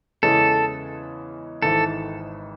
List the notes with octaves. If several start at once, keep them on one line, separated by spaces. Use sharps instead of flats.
E2 C#3 E3 G#3 C#4 A4
G#1 G#2 E3 A4